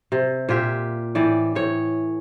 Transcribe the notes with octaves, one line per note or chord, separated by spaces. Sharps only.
C3
A#2 F4 G4 E5
A2 E3 D5
A2 C#5